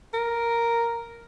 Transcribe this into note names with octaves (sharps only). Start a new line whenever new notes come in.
A#4